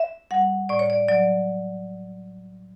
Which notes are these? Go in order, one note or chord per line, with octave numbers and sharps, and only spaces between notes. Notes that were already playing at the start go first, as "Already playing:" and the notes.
Already playing: E5
G3 F#5
A2 D5
C#5
D5
F#3 D5